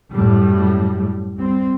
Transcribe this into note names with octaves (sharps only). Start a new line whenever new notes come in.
F#2 A2 G3
G3 C4